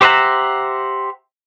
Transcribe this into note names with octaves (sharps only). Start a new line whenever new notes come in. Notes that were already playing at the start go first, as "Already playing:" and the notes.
G4 C5 E5 F#5 A#5